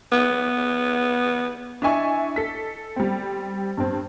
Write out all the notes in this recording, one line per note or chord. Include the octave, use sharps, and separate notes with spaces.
B3
D4 E4 D#5 E5 G#5 C#6
A4 B6
G3 C4
G2 C4